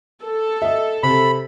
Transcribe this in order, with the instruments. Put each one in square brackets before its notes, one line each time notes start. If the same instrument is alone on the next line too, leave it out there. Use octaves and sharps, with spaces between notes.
[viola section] A4
[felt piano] D#5 E5
[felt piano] C3 [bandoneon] B5